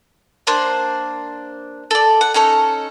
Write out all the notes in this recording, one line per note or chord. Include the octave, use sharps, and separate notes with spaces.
A#3 D4 C5
A4 D5
F#5
C#4 D#4 A4 C#5